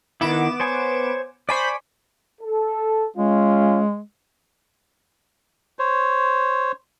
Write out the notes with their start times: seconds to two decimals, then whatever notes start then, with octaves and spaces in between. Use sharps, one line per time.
0.21 D#3 B3 E4 D6 E7
0.60 C5 C#5 G#5
1.49 C5 D5 G#5 B5 C#6 B6
2.41 A4
3.16 G#3 C#4 F4
5.79 C5 C#5